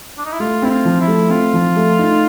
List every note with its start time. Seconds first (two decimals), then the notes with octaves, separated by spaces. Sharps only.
0.18 D4
0.25 D#4
0.32 E4
0.40 A3 F4
0.62 C4 E4
0.70 F4
0.85 F3
1.01 E4
1.07 A3
1.30 C4 F4
1.54 F3
1.76 A3
1.98 D#4